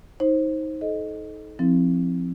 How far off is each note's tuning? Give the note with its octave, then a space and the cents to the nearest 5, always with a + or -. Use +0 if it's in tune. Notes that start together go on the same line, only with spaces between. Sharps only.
D#4 +20 C5 +20
A4 -30 D#5 +0
F3 +0 C4 +0 E4 -20